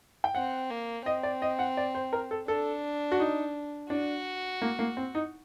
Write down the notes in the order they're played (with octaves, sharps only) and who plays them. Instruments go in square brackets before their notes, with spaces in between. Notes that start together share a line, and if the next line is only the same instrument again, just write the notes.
[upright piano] G5
[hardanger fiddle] C4 [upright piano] F#5
[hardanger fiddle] A#3
[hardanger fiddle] C4 [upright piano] D#5
[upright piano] D5
D#5
F#5
D5
C5
A#4
A4
[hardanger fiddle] D4 [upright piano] A4
[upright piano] F#4
D#4
[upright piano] D4 [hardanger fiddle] F#4
[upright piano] A#3
A#3
C4
D#4